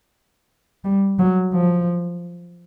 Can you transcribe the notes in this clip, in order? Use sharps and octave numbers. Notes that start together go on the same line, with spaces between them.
G3
F#3
F3